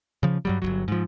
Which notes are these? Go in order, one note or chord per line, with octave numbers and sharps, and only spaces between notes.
C#3 F3
G2 F#3 G3
G1 D#2 F#3
G#2 F3